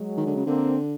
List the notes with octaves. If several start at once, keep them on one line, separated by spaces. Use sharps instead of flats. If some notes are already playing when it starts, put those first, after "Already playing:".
Already playing: F#3 G#3
D#3
D3
C#3
D3 A#3 C4